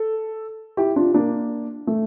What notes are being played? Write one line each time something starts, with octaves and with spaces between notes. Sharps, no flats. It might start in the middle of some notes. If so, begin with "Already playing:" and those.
Already playing: A4
E4 G4
D4 F4
A#3 D4
A3